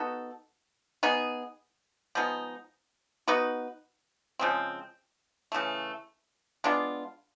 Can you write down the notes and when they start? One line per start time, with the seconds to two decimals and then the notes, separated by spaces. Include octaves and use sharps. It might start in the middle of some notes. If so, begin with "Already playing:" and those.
Already playing: B3 D#4 F#4 A4
1.03 B3 D#4 G#4
2.15 F3 G#3 B3 D#4
3.28 B3 D#4 F#4 B4
4.39 C#3 F3 G#3 C4
5.52 C#3 E3 A3
6.64 G#3 B3 D4 F4